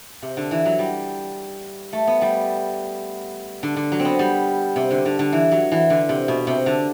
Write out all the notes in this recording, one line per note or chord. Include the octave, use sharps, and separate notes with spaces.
C3
D3
E3
F#3
G3
A3
B3
G3
D3
D3
F#3
C4
B3
G3
C3
D3
D3
D3
E3
F#3
E3
D3
C3
B2
C3
D3